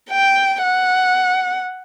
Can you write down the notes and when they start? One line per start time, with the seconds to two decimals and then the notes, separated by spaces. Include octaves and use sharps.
0.10 G5
0.63 F#5